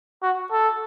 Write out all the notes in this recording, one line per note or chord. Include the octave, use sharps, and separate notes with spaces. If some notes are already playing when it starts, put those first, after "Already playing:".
F#4
A4